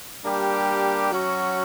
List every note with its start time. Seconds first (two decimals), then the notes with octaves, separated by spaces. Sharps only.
0.23 G3 A#3 D4 G4
1.12 F#3 C#4 F#4